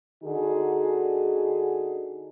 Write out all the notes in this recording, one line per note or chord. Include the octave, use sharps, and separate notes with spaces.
D3 D#4 F#4 G#4